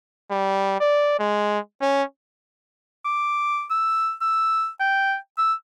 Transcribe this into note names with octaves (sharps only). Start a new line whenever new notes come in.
G3
D5
G#3
C#4
D6
E6
E6
G5
E6